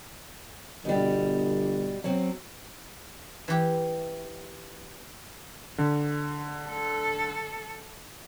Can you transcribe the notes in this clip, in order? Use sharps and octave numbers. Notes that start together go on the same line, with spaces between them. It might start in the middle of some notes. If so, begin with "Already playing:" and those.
G1 B2 G3
F#3 C4
E3 G4
D3
A4